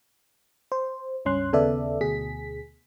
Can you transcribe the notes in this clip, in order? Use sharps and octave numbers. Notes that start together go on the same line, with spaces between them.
C5
C#2 G2 C#4 C6 F#6
D#2 C#3 B3 A4 D5 E5
D2 B2 G#4 B6